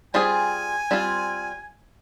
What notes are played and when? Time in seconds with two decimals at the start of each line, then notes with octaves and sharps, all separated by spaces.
0.14 G3 C4 F4 G#4 G#5
0.91 G3 C4 F4